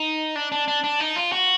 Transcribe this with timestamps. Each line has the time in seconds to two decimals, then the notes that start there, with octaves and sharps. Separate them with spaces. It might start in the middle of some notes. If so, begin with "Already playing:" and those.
Already playing: D#4
0.36 D4
0.52 D4
0.68 D4
0.84 D4
1.00 D#4
1.16 F4
1.32 F#4